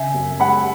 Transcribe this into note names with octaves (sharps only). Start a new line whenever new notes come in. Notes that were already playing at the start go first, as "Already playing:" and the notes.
Already playing: C#3 E5 G#5
F#2
G#3 F#5 B5